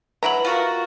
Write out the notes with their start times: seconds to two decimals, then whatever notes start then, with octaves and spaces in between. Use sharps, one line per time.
0.23 F#3 E4 B4 A#5 D7 F#7
0.45 F4 F#4 A#4